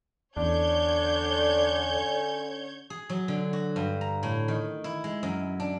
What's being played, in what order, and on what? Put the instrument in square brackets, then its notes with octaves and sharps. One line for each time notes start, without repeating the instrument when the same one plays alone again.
[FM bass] E2 [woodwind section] D3 C#4 [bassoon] D4 [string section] C#5 G6 G#6
[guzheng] G#4
F#3
D3
F#4
G2
A#5
A2
D#3
E4
G#3
F#2
D4